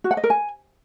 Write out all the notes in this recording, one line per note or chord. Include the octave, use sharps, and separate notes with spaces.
F#4
F#5
D#5
A#4
G#5